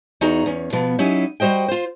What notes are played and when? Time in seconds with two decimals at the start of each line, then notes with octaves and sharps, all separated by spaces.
0.21 E2 D#4 F#4 G#4 A#5
0.46 E2 C#4
0.73 B2 F3 B3
0.98 F#3 C#4 D#4 E4 G4
1.40 G3 F#4 C5 D#5 G5
1.68 F4 C5